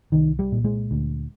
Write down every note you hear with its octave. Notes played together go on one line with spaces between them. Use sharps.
C2 D#3
G3
A#2
G#3
D2